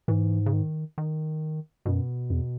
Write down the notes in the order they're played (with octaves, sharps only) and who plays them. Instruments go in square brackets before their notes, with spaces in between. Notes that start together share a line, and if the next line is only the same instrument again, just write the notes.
[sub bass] G#2 [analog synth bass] E3
[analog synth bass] C#3
D#3
D#3
[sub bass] F#2 [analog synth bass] B2
[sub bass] E2